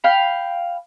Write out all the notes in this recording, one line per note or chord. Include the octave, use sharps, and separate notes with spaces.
F5 G5 B5